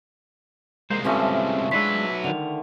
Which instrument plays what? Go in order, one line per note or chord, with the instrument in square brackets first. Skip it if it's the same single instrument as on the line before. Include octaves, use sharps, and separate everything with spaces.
[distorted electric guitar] C2 G#3 [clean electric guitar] A#3 C5
[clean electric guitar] C3 C#4 E5 [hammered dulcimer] E3 F3 A3
[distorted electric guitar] F#3 B4 [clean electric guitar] G#3 D4 C6 [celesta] E6 B6
[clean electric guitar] D3 D#3 [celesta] F7